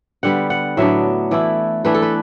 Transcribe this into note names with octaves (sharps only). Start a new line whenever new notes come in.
D3 G3 B3 F#5
F#5
A2 F#3 B3 D4 E5
E3 A3 E4 D5
E3 A3 D4 B4
A4
B4